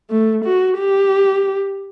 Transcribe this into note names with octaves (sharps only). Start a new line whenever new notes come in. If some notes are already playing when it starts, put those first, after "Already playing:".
A3
F#4
G4